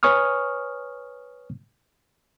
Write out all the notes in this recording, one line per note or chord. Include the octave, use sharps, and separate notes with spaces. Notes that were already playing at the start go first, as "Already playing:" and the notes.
B4 C#5 G#5 C#6 D#6 F6